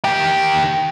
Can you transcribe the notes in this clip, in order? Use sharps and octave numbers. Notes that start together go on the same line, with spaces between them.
D#3 G4